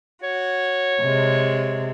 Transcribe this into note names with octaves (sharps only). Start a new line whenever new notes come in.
F#4 C#5
C3 G#3